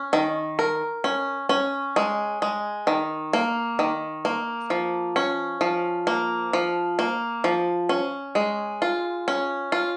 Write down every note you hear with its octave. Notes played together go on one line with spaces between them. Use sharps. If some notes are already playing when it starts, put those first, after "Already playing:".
Already playing: C#4
D#3
A#4
C#4
C#4
G#3
G#3
D#3
A#3
D#3
A#3
F3
C#4
F3
A#3
F3
A#3
F3
C#4
G#3
F4
C#4
F4